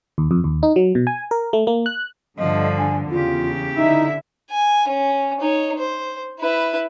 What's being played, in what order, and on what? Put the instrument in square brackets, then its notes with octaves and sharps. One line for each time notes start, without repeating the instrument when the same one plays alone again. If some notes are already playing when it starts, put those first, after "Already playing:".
[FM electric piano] D#2
F2
D#2
D#4
F#3
B2
G#5
A#4
A3
A#3
F#6
[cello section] G2 D3 [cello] F3 [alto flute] D#5
[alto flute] G#5
[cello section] E2 [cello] C#3 G4 [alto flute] F4
[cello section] D3 E4 E5 [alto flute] D#4
[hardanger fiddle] G#5
C#4
D#4 C#5
C5
E4 B4